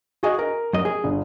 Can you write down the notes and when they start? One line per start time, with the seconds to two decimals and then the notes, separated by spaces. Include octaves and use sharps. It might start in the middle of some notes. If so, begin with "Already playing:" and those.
0.23 F#4 G#4 D#5
0.39 A#4
0.73 F#2 D#5
0.85 G#4
1.04 G1